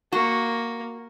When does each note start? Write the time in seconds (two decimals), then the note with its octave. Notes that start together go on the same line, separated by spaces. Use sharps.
0.12 A#3 F#4